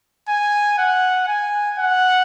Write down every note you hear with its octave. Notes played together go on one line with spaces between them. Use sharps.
G#5
F#5
G#5
F#5